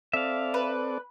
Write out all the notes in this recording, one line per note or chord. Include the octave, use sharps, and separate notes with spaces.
C4 A4 D5 E5 F5
B4